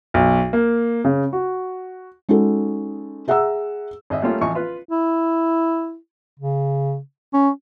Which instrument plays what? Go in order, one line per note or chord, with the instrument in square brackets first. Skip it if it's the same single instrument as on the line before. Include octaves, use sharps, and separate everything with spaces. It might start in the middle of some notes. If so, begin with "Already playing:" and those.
[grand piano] B1
A#3
C#3
F#4
[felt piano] G#3 C#4 D#4 F#4 A4
G#4 E5 F#5 A#5 E6
[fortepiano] G#1 D#5 E5
G3 A3 A#3 C#4 F4
A1 F3 D#5 G#5 C#6
F4 B4
[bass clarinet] E4
C#3
C#4